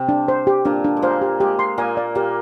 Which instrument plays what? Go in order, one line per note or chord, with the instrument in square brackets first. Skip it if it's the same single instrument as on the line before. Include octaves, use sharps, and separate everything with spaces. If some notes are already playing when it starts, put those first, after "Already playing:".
Already playing: [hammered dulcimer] C3 C4
[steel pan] D4
C5
G4
[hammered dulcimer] A#2 A#3 [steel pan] D4
[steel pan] D4
[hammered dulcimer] G#3
[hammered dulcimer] A#2 A#3 [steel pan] C5
[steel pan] G4
[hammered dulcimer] G#3 [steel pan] G4
[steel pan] C6
[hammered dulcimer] A#2 A#3 [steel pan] G#5
[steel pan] D5
[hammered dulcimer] A#2 A#3 [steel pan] G4